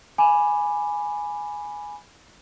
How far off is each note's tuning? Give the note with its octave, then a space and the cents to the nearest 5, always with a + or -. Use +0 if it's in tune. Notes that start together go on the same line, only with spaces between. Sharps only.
G#5 +0 B5 +0 D6 +5